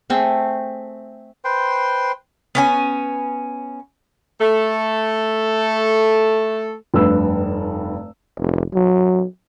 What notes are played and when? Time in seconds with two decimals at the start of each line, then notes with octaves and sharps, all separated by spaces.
0.10 A3 C4 G#4
1.45 B4 C5 G5 C6
2.55 B3 C#4 G#5
4.41 A3 A4
6.94 F1 G2 B4 E6
8.39 F1
8.74 F#3